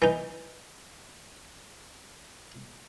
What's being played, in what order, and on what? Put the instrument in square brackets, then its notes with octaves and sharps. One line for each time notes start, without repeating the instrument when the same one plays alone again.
[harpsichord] E3 D#4